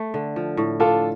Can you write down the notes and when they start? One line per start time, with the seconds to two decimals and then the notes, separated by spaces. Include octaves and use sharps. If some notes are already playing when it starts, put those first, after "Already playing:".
Already playing: A3
0.14 D3
0.36 F3
0.57 A2
0.80 D4 F4 A4